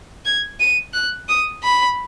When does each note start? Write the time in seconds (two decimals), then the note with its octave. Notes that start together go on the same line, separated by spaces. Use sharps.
0.25 G#6
0.60 D#7
0.94 F#6
1.28 D#6
1.63 B5